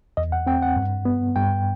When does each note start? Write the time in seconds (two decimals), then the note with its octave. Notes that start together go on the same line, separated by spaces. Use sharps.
0.17 E2 D#5
0.32 F#5
0.47 C4 G5
0.62 F#5
0.76 G2
1.05 B3
1.36 G2 G5